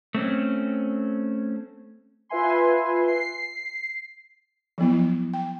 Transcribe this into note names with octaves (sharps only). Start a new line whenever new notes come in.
A3 C4 C#4
F4 B4 E5 G#5 C6
C7
F3 F#3 B3 E4
G5